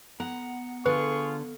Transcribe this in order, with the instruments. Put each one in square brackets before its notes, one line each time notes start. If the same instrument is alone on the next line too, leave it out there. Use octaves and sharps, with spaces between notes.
[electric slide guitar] B3 A#5 [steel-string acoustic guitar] F#5
[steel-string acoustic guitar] D3 [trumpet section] F4 G#4 C#6 [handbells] B4